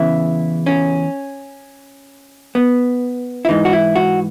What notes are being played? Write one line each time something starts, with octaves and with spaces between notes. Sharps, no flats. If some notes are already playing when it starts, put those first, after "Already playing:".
Already playing: E2 C#3 E3 E4
C#4
B3
E4
G#2 E3 D#4
F#4
E4
F#4